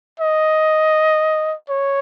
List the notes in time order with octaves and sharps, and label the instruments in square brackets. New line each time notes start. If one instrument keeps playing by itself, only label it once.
[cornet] D#5
C#5